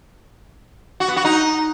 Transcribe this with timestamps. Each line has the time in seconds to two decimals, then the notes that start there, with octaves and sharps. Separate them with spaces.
1.00 F#4
1.08 B3
1.16 F#4
1.25 D#4